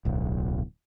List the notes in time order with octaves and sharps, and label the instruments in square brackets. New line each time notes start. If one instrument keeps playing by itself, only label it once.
[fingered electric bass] D1 B1